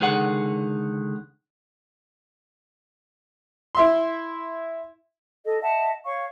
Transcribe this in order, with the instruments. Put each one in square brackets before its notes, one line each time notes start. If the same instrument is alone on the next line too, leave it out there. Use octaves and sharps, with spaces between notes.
[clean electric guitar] C#2 D3 D#3 G#4 F#5
[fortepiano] E4 E5 C6
[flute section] A4 D#5
D#5 E5 F#5 A5
C#5 F5 C#6